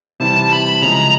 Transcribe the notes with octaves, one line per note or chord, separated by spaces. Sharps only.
C3 E3 G3 A5
B5
C#3 F3 G#3 A#5